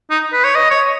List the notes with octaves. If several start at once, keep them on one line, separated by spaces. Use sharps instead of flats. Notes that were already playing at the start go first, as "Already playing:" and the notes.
D#4
B4
C#5
D#5
C#5